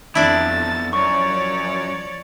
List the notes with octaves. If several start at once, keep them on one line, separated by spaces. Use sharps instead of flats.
F2 D3 B3 D4 E4 D5 A5 A6
F#2 F3 C#5 D5 C#6